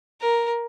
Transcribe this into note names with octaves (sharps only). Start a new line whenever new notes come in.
A#4